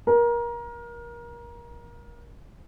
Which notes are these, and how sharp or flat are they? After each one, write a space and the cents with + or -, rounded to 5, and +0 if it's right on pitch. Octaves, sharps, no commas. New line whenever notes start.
A#4 +25